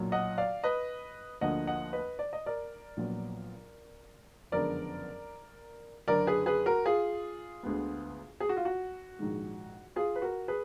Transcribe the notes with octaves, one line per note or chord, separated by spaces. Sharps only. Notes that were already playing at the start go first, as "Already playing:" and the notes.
Already playing: B1 A#2 F#3
D#5 F#5
D5 F5
B4 D#5
D2 D3 F3 A#3 D#5 F#5
D#5 F#5
B4 D#5
D5
D#5
A#4 D5
A#1 A#2 F#3 B3
F#1 F2 D3 G#3 B3 A#4 D5
F#1 F#2 D3 A#4 D5
G#4 B4
G#4 B4
F#4 A#4
F4 G#4
D2 D3 G#3 B3
G#4
F#4
F4
F#4
A#1 G#2 D#3 G#3
F4 G#4
B4
F#4 A#4
G#4 B4